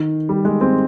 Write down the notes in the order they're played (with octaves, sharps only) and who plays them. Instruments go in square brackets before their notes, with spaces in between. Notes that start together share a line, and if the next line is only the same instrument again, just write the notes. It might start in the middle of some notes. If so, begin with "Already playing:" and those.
Already playing: [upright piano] D#3
G3
G#3
C4